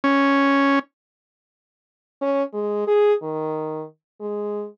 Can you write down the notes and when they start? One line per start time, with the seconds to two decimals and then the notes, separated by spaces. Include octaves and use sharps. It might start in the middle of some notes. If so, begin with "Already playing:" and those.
0.04 C#4
2.21 C#4
2.53 G#3
2.87 G#4
3.22 D#3
4.20 G#3